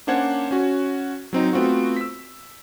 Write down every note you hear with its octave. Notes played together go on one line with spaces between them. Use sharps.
A#3 C#4 D4 C5 F#5 G#6
C#4 F#4
F#3 C4 D#4
A3 B3 C4 F4 F#4
E6 B6